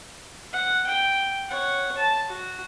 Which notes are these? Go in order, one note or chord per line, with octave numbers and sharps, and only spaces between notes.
F#5
G5
C#5 F#5
A5
F#4